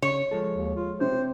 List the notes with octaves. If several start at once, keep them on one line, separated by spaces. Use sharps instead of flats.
C#3 C#5
F3 G#3 A4
D#2
F4
C3 C5